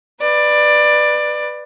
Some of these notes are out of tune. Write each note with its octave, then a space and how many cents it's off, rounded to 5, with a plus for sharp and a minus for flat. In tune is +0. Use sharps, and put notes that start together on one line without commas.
B4 +0 D5 +15